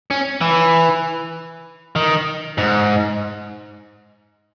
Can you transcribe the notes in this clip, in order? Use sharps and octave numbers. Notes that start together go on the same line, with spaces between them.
C#4
E3
D#3
G#2